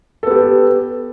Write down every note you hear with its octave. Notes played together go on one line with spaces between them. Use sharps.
B3 G4 A4